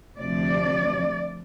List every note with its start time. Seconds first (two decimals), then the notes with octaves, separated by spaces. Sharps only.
0.17 D2 C3 F3 D5